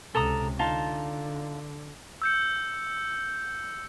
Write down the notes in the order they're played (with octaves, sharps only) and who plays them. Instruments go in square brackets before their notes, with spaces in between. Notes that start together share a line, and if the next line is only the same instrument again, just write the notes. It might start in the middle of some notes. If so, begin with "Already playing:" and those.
[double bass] C#2 C3 [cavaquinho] A4 A#5 D#6
[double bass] D3 [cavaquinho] D#4 F4 A5
[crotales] E6 G6 C#7